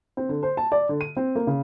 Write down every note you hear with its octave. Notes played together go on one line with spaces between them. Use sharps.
C4
D3
C5
A5
D5
D3
D#7
C4
A#3
C#3